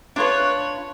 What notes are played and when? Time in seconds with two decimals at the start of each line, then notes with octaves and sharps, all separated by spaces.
0.16 D4 F4 B4 C#5